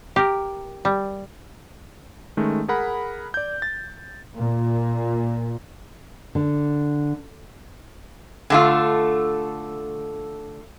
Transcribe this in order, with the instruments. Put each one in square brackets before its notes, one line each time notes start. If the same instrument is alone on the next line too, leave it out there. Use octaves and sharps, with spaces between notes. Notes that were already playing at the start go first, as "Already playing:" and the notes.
[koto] G4 A#4
G3
[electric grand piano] D#3 G#3 A3 C#4
G#4 A#4 F#5 B5
D5 G6
A6
[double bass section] A#2
[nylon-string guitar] D3
[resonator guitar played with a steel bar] D3 A3 F4